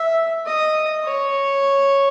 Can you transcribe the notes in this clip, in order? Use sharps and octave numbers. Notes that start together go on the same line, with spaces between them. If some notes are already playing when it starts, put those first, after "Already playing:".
Already playing: E5
D#5
C#5